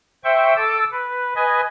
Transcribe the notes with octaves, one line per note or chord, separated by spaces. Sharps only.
C5 E5 G5 C#6
A4 A5 D6 E6
B4
B4 D#5 G#5